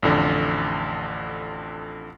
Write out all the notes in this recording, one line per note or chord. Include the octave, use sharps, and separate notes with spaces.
A1 F2 D3